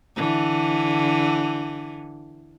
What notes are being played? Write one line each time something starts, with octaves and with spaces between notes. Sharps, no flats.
D3 E3